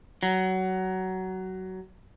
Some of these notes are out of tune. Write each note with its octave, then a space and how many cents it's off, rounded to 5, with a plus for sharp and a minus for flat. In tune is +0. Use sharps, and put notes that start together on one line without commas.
F#3 +20